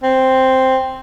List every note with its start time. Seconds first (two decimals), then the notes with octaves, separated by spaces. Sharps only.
0.04 C4